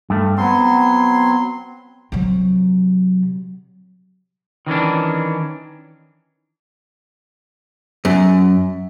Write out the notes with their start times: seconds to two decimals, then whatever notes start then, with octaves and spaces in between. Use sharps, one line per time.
0.10 G2 A3
0.38 F#3 B3 C4 C6
2.12 C3 F#3
4.67 D#3 E3 C#4 D4
8.05 F#2